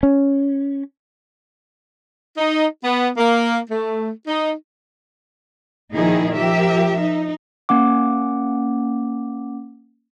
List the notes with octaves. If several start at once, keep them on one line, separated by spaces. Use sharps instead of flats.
C#4
D#4
B3
A#3
A3
D#4
A#2 D#3 F3 D#4 E4 G#4
F3 G4 A#4 E5
D#4
A#3 C#4 F#5 D6